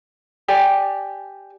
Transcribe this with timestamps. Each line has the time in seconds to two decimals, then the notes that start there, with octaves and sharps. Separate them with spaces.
0.48 G4 D5 G#5